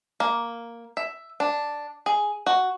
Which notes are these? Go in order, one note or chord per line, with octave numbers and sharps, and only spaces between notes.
A#3
E5
D4
G#4
F#4